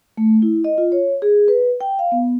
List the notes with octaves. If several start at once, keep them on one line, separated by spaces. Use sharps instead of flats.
A3
E4
D#5
F4
C#5
G#4
B4
G5
F5
B3